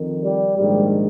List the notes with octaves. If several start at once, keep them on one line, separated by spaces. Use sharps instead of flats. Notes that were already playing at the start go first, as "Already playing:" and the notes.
Already playing: F2 D#3
G3
A#1 G#2 D#3 G3